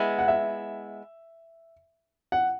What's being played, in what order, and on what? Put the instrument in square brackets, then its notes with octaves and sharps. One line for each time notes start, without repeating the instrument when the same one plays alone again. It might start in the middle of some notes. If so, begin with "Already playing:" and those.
Already playing: [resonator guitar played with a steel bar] G#3 B3 E4
[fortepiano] F#5
E5
F#5